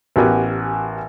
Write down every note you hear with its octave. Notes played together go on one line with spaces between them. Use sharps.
A1 B3 F#4 G4 A#4 G#5